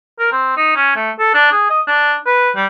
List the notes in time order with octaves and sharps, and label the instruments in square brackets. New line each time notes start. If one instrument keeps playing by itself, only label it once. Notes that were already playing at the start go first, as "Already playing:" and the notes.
[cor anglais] A#4
C4
D#4
C#4
A3
A4
D4
G#4
D#5
D4
B4
G3